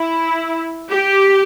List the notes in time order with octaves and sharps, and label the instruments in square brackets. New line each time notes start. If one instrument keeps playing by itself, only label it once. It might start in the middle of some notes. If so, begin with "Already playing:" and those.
Already playing: [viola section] E4
G4